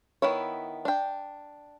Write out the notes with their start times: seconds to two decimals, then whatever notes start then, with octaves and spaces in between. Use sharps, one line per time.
0.22 D#3 B3 E4 C#5
0.85 D4 G5